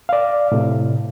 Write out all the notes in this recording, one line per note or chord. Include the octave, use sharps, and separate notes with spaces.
D5 F5
A2 C3